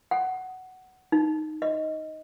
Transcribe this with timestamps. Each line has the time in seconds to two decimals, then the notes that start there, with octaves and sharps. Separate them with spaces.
0.11 F#5
1.12 D#4
1.62 D#5